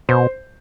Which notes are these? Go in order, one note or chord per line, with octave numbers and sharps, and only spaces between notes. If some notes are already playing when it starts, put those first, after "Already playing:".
B2 C5